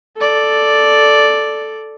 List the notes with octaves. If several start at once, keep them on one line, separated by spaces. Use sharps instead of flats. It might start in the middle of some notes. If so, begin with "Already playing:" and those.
A4 D5